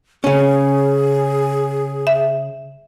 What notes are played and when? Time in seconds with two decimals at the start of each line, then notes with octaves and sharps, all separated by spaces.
0.24 C#3 C#4 G#4
2.07 E5